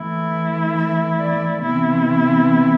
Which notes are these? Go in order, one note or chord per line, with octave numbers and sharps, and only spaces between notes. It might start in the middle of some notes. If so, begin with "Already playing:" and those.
Already playing: E3 A3 E4
E5
D5
C3 E3 B3 E4